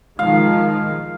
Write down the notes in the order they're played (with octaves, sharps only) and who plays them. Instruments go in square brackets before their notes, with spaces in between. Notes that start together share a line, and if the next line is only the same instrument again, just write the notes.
[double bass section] D#3 F3 G#3 [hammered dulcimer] F5